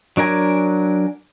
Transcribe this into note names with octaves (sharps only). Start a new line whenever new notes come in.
F#3 D4 A#4 G#5